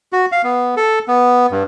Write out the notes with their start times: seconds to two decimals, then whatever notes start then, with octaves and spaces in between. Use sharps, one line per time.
0.13 F#4
0.32 F5
0.44 B3
0.77 A4
1.08 B3
1.51 G2